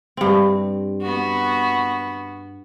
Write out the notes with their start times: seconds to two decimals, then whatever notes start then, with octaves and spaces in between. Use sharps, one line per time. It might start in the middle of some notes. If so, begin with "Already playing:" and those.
0.17 G2 C4
1.02 B3 F#4